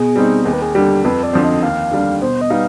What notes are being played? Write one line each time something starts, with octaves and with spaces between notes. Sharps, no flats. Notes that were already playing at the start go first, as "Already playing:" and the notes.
Already playing: B2 G#4
G3 C4 D#4
D#2 G#4
B4
G#4
D3 G3 G4
F2 B4
D5
D3 F3 C4
D#5
D#2 F5
D3 G3 D4
B2 C5
D#5
G3 B3 D#4 F5